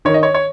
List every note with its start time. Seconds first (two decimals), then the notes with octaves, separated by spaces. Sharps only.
0.05 D#3 C#5
0.14 D#5
0.23 C#5
0.34 C#5